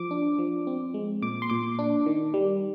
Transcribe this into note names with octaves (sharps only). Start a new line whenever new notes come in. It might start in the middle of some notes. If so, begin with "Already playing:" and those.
Already playing: F3 D6
D4
F3
C4
G#3
A#2 D6
C6
A#2 D6
D4
D#3
G3